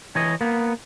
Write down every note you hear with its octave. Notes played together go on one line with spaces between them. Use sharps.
E3 C#5 D#5
A#3 B3